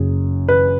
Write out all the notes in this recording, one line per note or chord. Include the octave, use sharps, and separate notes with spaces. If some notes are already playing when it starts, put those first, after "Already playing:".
Already playing: F#1 F#2 C#3 G#4
B4